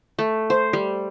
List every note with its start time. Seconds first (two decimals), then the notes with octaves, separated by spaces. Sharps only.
0.19 A3
0.50 C5
0.73 G3